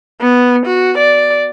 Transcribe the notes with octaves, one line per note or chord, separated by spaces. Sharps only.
B3
F#4
D5